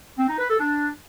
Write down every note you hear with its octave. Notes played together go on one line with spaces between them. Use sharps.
C4
D#4
B4
A4
D4